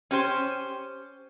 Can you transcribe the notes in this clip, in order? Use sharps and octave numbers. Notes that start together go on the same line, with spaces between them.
C#4 G4 C5